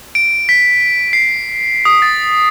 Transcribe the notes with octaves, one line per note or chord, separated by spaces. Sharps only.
D7
B6
C7
D#6
A6